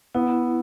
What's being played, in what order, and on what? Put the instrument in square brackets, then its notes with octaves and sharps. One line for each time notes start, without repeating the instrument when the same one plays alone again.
[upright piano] B3 [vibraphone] E4